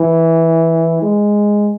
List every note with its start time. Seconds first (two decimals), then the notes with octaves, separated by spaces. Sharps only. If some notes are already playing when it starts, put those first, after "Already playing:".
Already playing: E3
1.02 G#3